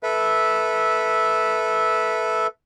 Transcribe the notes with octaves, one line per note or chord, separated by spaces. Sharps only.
A4 B4 E5